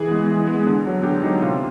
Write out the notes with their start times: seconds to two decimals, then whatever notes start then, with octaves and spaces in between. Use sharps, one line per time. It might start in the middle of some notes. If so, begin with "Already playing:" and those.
Already playing: E3 G#4
0.08 G#3 B3
0.28 E3
0.47 G#3 B3
0.66 D3
0.85 F#3 B3
1.03 D3 G4
1.22 F#3 B3 D#4
1.42 C3 F4